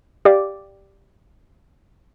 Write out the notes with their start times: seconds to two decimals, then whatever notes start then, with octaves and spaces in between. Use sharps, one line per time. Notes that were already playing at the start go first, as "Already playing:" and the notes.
0.25 G4 D5 F5 D6